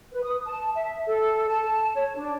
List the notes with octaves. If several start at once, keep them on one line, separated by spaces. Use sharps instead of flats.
B4
D#6
A5
E5
A4
A5
C#5
D4